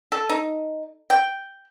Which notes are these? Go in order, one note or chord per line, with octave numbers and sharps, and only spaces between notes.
A4
D#4
G5